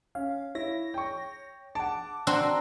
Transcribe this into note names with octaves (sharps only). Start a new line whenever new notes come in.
C#4 F5
E4 C#5 A#6
G5 C#6
F#5 A5 D6
C4 D4 F#4 A#5 C6 E6